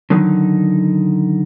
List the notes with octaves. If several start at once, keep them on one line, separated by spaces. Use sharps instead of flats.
D3 D#3 F#3 D#4